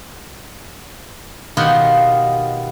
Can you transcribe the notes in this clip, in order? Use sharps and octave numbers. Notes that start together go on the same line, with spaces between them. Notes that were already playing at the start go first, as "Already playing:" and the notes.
B2 D#3 B3 F4 G4 F#5